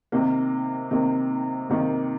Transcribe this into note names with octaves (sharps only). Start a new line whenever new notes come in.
C3 D#3 A#3
C3 D#3 A#3
C3 D#3 A#3